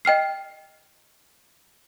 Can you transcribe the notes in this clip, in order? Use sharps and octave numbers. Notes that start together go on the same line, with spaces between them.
D#5 G5 F6 C7